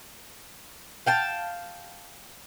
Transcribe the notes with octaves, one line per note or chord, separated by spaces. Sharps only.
F5 G5 A5